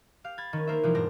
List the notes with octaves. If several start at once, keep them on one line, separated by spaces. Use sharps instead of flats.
G4 F5
B5 G#6 A6
D#3 C#4
A#3 A#4 C5 E5
B2 E3 F3 G3 E4 F4
D#1 G#2 G3 C4 D4 A#6